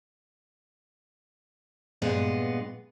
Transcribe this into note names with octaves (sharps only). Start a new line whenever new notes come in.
G2 A#2 G#3 B3